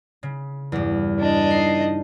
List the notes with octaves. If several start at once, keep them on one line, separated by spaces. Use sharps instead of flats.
C#3
E2 G2
D4 D#5
D#4 C7